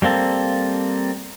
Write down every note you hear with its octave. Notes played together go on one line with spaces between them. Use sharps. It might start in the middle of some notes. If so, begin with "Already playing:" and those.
G3 A#3 C4 A4